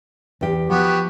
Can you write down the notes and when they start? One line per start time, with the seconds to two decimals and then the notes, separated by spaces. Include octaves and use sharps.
0.41 E2 G4
0.70 F3 B3 F#4 G4